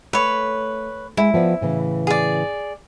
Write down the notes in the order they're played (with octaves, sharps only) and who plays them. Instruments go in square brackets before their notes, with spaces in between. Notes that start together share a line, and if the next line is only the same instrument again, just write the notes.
[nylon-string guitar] A3 [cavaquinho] B4 C#5
[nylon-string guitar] G#3 [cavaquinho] E4
[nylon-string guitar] F3 B3 D5
A2 C#3 E3
[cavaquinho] G#4 D5